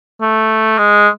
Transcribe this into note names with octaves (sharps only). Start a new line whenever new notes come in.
A3
G#3